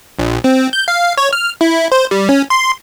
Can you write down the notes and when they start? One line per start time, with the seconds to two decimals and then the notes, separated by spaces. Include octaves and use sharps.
0.19 A#1
0.44 C4
0.73 G6
0.88 F5
1.18 C#5
1.33 F6
1.61 E4
1.92 C5
2.11 G3
2.29 C#4
2.50 C6